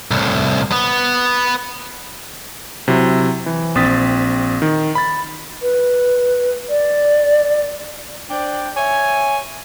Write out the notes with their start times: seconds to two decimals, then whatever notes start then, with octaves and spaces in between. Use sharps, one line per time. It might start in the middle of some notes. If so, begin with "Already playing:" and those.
0.11 C2 A2
0.72 B3
2.88 C3 F#3 E4
3.46 E3
3.75 A#1 C4 D#6 A6 B6
4.62 D#3
4.95 B5 A6
5.62 B4
6.69 D5
8.30 D4 C5 D5 G5
8.76 C#5 E5 G#5